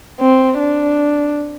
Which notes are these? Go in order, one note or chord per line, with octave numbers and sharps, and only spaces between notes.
C4
D4